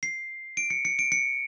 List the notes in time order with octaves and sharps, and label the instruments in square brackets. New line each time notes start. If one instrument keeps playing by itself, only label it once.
[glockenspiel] C7
D7
C#7
C#7
D7
C#7